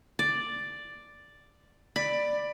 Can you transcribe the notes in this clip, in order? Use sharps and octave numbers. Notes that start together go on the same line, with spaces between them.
D5
D5 B5